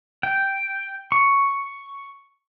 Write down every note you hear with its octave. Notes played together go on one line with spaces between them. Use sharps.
G5
C#6